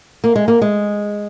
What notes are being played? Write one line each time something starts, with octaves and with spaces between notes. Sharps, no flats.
A#3
G#3
A#3
G#3